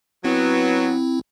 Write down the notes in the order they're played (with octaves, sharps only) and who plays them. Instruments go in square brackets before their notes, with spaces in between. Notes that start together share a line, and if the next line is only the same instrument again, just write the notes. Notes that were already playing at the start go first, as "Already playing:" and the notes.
[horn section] F#3 B3 [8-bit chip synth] C4 E4